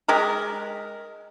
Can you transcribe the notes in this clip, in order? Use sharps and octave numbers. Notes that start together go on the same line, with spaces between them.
G#3 G4 A#4